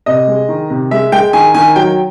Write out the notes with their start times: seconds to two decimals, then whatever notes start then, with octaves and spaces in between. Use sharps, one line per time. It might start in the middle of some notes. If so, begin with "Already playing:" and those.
0.06 C3 D#5
0.27 G#3
0.49 D#3
0.70 C3
0.91 G#3 E5
1.12 G#3 G5
1.33 D#3 G#5
1.54 D#3 G#5
1.76 F#3 G5